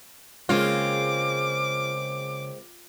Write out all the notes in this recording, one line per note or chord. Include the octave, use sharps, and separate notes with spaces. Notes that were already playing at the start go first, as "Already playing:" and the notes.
C#3 G#3 A#3 C4 F4 C#5 D6